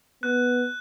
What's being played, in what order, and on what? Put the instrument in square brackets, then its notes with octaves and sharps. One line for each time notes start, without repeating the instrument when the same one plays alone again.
[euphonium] B3 [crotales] F#6